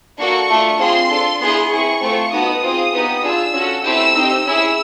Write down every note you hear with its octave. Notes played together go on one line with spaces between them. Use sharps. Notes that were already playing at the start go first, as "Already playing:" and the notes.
A#3 D4 F#4 A4 C#6
A3 D4 F4
C4 F4 G#4 C6
D4 F4 A4
B3 E4 G#4 C6
C4 E4 G#4 C#6
A3 C4 F4 A4
B3 D#4 F#4 A4 D#6
C4 F4 G#4
B3 D#4 G4
D4 F4 G#4 E6
C#4 F#4 A4
A3 C4 E4 G4 E6
C4 D#4 G4
C#4 E4 G#4 E6